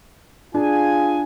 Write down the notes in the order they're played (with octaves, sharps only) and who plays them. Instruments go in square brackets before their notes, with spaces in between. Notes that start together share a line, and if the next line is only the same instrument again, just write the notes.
[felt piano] D4 [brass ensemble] F4 G#4 G#5